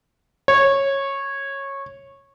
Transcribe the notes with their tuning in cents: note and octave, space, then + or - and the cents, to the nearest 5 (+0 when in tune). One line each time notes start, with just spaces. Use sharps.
C#5 -15